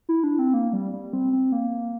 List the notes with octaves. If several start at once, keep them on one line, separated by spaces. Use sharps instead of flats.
E4
D4
C4
A#3
G3
G3
C4
C4
A#3